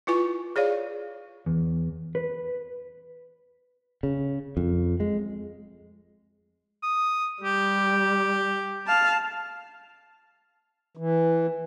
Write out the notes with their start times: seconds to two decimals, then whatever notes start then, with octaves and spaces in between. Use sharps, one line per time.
0.07 E4 F4 B4 G#5 C#6
0.56 G#4 C#5 D5 F5
1.46 E2
2.15 B4
4.03 C#3
4.57 F2
5.00 G#3
6.83 D#6
7.43 G3 G4
8.87 F5 A5
10.97 E3